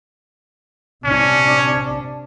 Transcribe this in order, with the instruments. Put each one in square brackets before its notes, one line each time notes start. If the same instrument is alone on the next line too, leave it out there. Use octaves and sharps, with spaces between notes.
[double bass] C3 D4 [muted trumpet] C#4